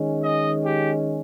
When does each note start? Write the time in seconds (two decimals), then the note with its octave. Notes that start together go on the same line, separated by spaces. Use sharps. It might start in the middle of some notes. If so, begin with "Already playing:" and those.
Already playing: D#3 G#3 C#4
0.24 D#5
0.63 G4